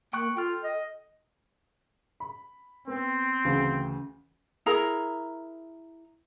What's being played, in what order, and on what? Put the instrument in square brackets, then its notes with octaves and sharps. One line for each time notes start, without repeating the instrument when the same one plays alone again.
[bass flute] A#3 [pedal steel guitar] G5 C#6 F#6
[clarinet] F4 [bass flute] A4 [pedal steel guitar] G5 F6
[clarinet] D#5
[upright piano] B5
[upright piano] B3 [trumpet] C4
[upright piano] D2 C#3 E3
[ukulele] E4 G#4 A#4 A#5